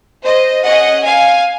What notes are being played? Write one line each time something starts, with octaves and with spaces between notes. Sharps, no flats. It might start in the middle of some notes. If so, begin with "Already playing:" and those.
C5 D#5
C#4 G#4 D#5 F#5
F5 G#5